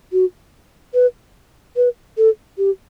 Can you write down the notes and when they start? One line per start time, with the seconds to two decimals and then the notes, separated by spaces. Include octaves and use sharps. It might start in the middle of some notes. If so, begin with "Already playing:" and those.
0.13 F#4
0.94 B4
1.76 B4
2.18 A4
2.58 G4